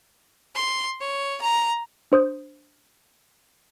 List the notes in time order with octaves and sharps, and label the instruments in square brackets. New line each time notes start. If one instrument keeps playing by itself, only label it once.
[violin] C6
C#5
A#5
[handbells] D4 C5 D#6 G6